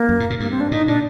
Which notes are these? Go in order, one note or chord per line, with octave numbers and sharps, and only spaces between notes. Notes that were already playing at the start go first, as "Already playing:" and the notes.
Already playing: A#3
F#2
A2
A#2
G2 A#3
C4
D4
A2 D#4
A#2 D4